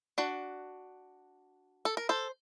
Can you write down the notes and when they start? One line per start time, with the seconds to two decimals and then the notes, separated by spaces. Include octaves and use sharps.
0.18 D4 F#4
1.85 A4
1.97 A#4
2.09 A4 C5